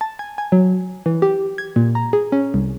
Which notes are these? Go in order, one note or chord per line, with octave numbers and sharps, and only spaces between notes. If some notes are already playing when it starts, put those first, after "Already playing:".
A5
G#5
G#5
F#3
E3
G4
G#6
A#2
A#5
G#4
C#4
C2